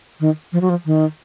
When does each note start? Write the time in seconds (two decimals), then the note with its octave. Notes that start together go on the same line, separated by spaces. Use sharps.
0.20 D#3
0.53 F3
0.61 F#3
0.70 F3
0.85 D#3